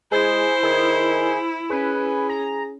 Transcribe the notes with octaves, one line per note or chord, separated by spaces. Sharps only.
G#3 E4 G#4 C5
D#3 G#4
C#4 G#4 B4
A#5